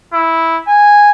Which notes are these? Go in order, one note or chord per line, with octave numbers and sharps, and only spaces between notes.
E4
G#5